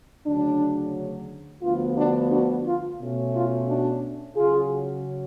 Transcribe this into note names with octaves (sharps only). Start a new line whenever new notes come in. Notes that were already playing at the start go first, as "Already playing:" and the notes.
D2 C#3 F#3 D4
D2 D3 F3 B3 F4
D4 F#4
D4 F#4
F4
B2 A3 C#4
F4
D4 F#4
C#3 F#3 C#4 F4 G#4